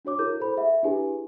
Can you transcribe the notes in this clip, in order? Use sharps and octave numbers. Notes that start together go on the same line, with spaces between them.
D4 F#4 C#5 D6
E4 G#4 A#4 G6
A4 C5 B5
G#4 E5 F#5
D4 E4 G4 G#4 B4 G#5